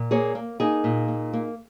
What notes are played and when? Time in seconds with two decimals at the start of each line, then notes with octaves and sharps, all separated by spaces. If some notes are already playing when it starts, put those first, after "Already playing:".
Already playing: A#2
0.11 A#3 G#4 C#5
0.35 A#3
0.60 A#3 D#4 G#4
0.84 A#2
1.08 A#3
1.33 A#3